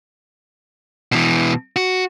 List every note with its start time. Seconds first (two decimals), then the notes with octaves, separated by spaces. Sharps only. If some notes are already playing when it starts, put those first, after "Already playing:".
1.12 B2 E3
1.76 F#4